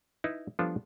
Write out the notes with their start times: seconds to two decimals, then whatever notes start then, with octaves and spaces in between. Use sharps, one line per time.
0.24 D#4 E4 B4
0.59 F3 G3 B3 D4 F4 A4